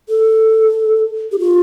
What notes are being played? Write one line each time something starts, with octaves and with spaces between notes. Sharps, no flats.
A4
G4
F4